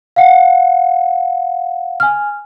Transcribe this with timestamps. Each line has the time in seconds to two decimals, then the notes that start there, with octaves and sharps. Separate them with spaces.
0.16 F5 F#5
2.00 G#5 F6